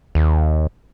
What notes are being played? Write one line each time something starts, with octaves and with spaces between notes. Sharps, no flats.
D#2